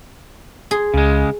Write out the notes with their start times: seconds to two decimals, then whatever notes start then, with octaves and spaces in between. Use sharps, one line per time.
0.71 G#4 C6
0.94 C#2 C#3 G#3